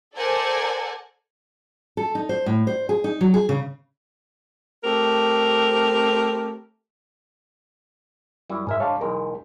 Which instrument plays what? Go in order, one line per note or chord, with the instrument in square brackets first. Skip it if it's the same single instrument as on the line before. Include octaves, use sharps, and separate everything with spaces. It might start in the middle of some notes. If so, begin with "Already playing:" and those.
[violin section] A4 A#4 C5 D5 F#5 G#5
[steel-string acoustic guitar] A4
D#4
C5
A2
C5
G#4
D#4
F#3
G#4
C#3
[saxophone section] A3 C4 G4 A#4
[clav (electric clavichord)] F#2 G3 E4
[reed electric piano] G#2 E5 [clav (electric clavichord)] G#3 A#4 G#5
[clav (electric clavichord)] G#3 D4 [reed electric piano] C#5 F5 A5
[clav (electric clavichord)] B1 E2 G#3 [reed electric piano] A#4